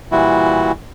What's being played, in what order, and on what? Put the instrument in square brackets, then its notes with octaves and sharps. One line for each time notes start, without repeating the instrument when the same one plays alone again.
[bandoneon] A#2 E3 G3 E4 F#4